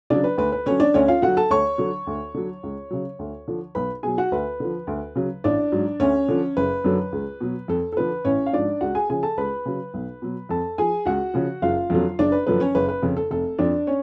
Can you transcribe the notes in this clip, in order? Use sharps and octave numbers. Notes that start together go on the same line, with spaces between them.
C#3 F#3 D4 D5
B4
D2 B4
B4
D3 F#3 C#4 C#5
D4 D5
D2 C#4 C#5
F4 F5
D3 F#3 F#4 F#5
A4 A5
D2 C#5 C#6
D3 F#3
D2
D3 F#3
C#2
C#3 F#3
D2
D3 F3
B1 B4 B5
B2 F#3 G#4 G#5
F#4 F#5
D2 B4
D3 F3
D2
C#3 F#3
A1 D4 D5
G#2 F#3
D2 C#4 C#5
D3 F3
F#1 B4
F#2 D3 F#3
C#2
B2 F#3
F2 A4
A4
D3 F3 B4
A1 C#4 C#5
F5
G#2 F3 D4 D5
C#2 F#4 F#5
G#4 G#5
C#3 F3 G#4 G#5
A4 A5
C#2 B4 B5
C#3 F#3
B1
B2 F#3
F2 A4 A5
F3 G#4 G#5
C#2 F#4 F#5
C#3 F3
F#1 F4 F5
F2 D3 F#3
F#1 D4 D5
B4
F#2 D3 F3 B4
C#4 C#5
F#1 B4
B4
F2 C#3
A4
F1 A4
F2 F3 D4 D5
C#4 C#5